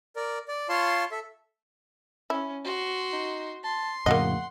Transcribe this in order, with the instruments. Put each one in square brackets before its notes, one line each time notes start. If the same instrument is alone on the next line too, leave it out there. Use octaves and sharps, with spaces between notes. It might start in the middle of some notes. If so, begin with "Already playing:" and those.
[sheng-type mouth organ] A#4 D5
D5
F4 C#5 F5 A5 C6
A4 E5
[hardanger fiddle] C#4 [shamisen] E4
[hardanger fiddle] F#4 C6
[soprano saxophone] D#4
[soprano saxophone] A5 [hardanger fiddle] C6
[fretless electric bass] F2 A2 C#3 [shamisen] A#3 F#4 D#5 [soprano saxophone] F#5